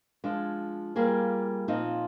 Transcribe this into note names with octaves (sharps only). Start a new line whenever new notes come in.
F3 G#3 D4
G3 A#3 F4 G#4
A#2 F3 C4 D#4